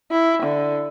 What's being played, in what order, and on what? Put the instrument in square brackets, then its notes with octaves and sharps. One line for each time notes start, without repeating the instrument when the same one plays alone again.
[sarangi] E4
D3